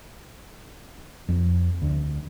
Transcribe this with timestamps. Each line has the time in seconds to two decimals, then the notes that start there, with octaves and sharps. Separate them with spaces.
1.29 F2
1.82 D2